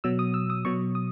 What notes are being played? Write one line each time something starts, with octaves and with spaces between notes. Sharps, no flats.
B2 F#3 E6
D#6
E6
D#6
B2 F#3 C#6
D#6